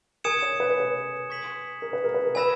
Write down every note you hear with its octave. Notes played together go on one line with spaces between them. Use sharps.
A#4 G#5 D#6 G#6 C#7 E7
C#5
B4
C#5
B4
C#6 G#6 B6 F#7
A#4
B4
A#4
B4
A#4
B4 G#5 B5 E6 A#6 E7